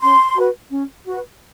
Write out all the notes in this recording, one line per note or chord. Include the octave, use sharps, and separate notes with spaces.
C#4 C6
F#4 B4
C#4
F#4 B4